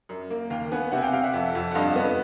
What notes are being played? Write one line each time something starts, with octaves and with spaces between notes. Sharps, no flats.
F#2
A#3
D#2 F5 G5
B3 F#5 G#5
C3 E5 F#5
G#5
F5 G5
C3 F5 G5
E5 F#5
F2
F2
F#5
G2 D#5 F5
B3